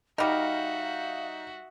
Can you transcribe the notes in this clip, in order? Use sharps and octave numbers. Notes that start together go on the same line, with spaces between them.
G3 D#4 F#4 A#4 E5 F5